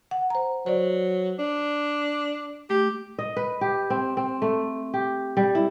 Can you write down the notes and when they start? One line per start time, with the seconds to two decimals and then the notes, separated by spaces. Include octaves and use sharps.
0.11 F#5
0.30 C5 A#5
0.66 F#3 C5 D5
1.39 D4
2.70 A3 G4
3.19 D#5
3.36 B4
3.61 G4
3.90 C4
4.17 C4
4.42 A3
4.94 G4
5.37 G3
5.55 E4